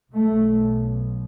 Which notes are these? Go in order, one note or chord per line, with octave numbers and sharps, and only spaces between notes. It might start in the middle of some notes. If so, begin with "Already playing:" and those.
B1 B2 A3